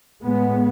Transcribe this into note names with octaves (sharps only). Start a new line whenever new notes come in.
A2 G#3 B3